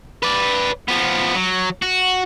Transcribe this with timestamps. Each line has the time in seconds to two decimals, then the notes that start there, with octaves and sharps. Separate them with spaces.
0.23 B4 D5
0.88 F3 B3
1.35 F#3
1.82 F#4